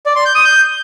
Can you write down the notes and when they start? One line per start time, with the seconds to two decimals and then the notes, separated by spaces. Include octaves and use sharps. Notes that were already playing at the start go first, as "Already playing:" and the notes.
0.06 D5
0.16 C6
0.25 G6
0.35 D#6
0.45 G6